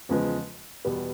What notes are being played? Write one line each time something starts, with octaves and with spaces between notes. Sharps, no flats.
E2 C#3 F3 G#3 B3
E2 B2 G3 B3